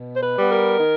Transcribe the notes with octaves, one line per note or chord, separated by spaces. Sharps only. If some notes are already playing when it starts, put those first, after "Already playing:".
Already playing: B2
C5
B4
G3 B3
A#4
D#3